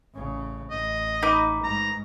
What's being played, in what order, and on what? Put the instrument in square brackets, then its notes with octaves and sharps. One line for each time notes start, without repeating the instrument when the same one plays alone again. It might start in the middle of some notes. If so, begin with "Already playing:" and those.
[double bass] A1 C#3
[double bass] A1 [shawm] D#5
[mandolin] D#4 B4 D6
[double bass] G#2 [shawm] A#5